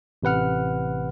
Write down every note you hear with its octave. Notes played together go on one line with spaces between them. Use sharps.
A1 C3 B4 F#5 F6